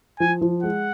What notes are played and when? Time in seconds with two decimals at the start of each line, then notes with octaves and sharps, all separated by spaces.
0.20 F3 G#5
0.41 F3
0.63 G#3 F#5